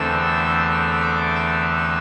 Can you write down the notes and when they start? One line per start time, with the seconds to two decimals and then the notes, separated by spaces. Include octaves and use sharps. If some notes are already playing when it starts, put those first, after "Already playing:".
Already playing: E2 D3 A3 C4 E6
1.01 D6
1.35 E6
1.69 E6